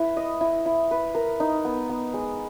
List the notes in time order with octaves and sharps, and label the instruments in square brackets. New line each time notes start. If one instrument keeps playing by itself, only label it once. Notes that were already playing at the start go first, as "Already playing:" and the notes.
Already playing: [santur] E4 B4
D#5
E4
E4
B4
A#4
D#4
B3
B3
G#3